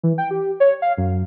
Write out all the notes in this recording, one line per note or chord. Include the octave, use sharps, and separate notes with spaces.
E3
G5
G4
C#5
F5
F#2